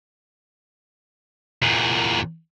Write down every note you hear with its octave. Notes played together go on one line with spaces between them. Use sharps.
E2 A#2